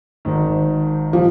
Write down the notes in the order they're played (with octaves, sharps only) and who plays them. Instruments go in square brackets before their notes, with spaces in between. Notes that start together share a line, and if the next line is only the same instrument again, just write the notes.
[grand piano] G#1 G#2 D#3
[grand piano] A#2 G3 C4 F4 [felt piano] F3